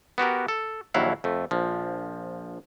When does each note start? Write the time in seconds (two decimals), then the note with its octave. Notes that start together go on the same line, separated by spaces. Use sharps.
0.18 B3 F#4 G4 A#4
0.48 A4
0.94 A#1 D#2 F#3 E4 F5 F#5
1.24 F2 A3
1.51 A#1 F3